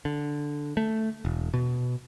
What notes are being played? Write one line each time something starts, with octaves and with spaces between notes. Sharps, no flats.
D3
A3
E1
B2